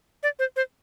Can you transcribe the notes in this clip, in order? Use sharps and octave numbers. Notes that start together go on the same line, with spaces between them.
D5
C5
C5